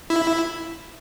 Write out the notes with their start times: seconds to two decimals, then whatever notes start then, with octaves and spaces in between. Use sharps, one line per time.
0.10 E4